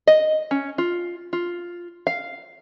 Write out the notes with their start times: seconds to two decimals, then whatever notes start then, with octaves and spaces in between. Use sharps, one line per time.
0.07 D#5
0.51 C#4
0.78 F4
1.33 F4
2.07 F5